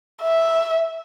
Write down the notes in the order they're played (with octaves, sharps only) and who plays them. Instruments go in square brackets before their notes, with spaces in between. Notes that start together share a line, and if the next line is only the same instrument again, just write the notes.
[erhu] E5